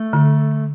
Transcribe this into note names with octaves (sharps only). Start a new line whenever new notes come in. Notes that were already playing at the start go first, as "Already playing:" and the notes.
Already playing: A3
D3